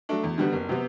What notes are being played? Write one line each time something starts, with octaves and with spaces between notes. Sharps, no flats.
F#3 A3 D4
E2
D3 G3 B3 F#4
F#1
C3 F#3 B3